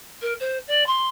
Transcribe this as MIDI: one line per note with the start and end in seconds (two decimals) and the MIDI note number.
0.22 0.33 70
0.40 0.58 72
0.67 0.86 74
0.86 1.08 84